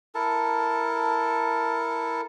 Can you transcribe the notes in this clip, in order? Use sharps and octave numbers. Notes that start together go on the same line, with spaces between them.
E4 A4 A#4 A5